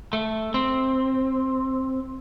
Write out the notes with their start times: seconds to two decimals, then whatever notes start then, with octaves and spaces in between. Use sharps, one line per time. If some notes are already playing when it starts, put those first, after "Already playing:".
0.13 A3
0.54 C4